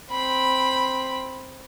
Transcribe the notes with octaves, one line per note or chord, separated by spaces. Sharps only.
C4 B5